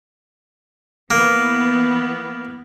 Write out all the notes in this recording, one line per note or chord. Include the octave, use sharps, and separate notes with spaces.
E3 A#3 B3